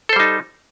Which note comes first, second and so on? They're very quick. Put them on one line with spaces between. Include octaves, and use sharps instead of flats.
A4 C5 G3 D#4